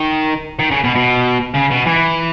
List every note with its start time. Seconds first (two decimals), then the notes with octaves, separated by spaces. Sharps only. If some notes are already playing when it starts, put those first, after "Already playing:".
Already playing: D#3
0.59 D#3
0.71 C#3
0.84 B2
0.95 B2
1.54 C#3
1.71 B2
1.86 E3